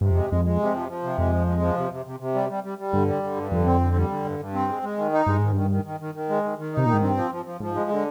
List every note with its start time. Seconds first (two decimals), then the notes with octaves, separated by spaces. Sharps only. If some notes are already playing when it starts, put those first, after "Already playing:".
0.01 G2 C3
0.11 F2 G#3
0.30 F2 G#3
0.45 G#3
0.60 C3
0.74 F3
0.89 F3
1.03 C3
1.18 F2 G#3
1.32 F3
1.47 G#3
1.61 F3
1.76 C3
1.91 C3
2.06 C3
2.20 C3
2.34 G3
2.50 G3
2.64 G3
2.78 G3
2.93 G2 D3
3.08 G3
3.23 D3
3.37 G2
3.52 F2 D3
3.66 C4
3.81 D3
3.96 G3
4.10 D3
4.25 G2
4.39 G2
4.54 C4
4.69 G#3
4.83 G#3
4.97 D#3
5.12 D#4
5.26 G2 G#3
5.39 G#2 D#3
5.52 G2 D#3
5.71 D#3
5.85 D#3
6.00 D#3
6.15 D#3
6.29 G#3
6.44 D#3
6.58 D#3
6.73 C3 D#4
6.86 A#2 D#3
6.93 G#2
7.02 G2 C4
7.17 F3
7.31 F3
7.45 F3
7.60 G#2 F3
7.75 G#3
7.90 D3